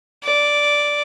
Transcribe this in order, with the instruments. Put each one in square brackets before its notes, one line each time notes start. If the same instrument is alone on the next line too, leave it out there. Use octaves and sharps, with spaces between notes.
[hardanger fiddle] D5